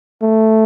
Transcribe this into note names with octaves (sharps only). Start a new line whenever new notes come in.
A3